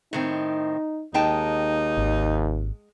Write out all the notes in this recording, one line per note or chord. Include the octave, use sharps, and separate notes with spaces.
A2 D#3 C4 D#4
D#2 G#3 D#4 G5 A5
G#1